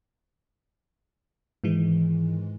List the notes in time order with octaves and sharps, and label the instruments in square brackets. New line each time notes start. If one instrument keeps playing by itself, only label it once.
[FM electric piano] G#2 D#3 E3 G#3